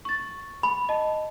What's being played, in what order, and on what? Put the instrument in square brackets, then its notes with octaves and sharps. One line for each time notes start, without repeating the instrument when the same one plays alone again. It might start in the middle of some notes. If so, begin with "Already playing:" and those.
[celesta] C#6 A6
[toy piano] B5
[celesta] D#5 A5